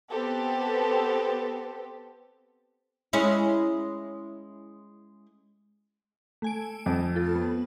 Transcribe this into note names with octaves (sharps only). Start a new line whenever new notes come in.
B3 C4 G4 A4
G#3 C#4 E4
A3 G#5 D7
F2
F4 A4
B3